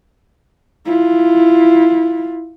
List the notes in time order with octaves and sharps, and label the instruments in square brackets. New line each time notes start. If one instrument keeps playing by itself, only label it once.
[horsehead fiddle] E4 F4